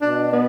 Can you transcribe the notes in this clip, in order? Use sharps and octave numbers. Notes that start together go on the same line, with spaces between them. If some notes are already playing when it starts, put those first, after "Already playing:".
B2 D4
B3